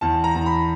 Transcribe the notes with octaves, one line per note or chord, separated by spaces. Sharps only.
E2 A5
A#5
E2
B5